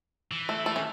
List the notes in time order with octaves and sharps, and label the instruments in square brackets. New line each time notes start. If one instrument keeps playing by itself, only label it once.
[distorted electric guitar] E3
[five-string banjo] A3
A3
C#4